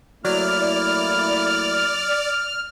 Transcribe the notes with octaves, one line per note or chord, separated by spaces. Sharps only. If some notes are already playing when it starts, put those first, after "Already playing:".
F#3 A3 A#3 E4 D5 F6